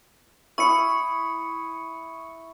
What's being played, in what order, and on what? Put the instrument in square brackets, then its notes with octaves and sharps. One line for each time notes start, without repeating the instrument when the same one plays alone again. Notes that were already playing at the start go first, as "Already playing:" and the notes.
[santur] E4 D#6 [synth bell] C#6 C#7